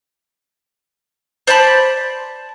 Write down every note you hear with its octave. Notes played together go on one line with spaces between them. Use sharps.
C5 D5 A5 B5